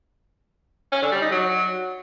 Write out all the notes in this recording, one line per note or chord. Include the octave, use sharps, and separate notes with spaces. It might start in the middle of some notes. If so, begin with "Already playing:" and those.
C#4
D3
G3
D#4
F#3